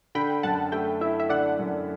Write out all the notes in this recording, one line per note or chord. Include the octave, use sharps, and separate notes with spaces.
D3 G5 B5
F#2 F#5 A5
A3 E5 G5
E4 E5
E5
D3 D5 F#5
F#2